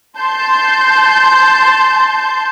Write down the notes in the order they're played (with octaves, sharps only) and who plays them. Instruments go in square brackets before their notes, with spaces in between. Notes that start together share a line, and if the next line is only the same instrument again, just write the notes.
[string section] A5 C6 G6